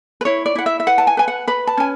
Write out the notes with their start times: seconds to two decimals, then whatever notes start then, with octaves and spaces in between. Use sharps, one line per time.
0.21 B4
0.25 E4 C#5
0.46 D5
0.55 E4 F#5
0.66 E5
0.80 E5
0.87 B4 F#5
0.98 A5
1.07 G#5
1.17 B4 G#5
1.28 F#5
1.47 B4 B5
1.67 A5
1.78 C#4 G#5